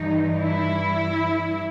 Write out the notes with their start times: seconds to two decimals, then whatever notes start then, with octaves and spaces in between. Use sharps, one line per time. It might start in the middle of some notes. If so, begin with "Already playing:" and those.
Already playing: G2 E3 D#4
0.41 E4